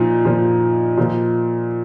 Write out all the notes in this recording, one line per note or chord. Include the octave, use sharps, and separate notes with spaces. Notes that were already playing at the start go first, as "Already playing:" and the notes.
Already playing: A#2 F3 D#4
A#2 F3
A#2 F3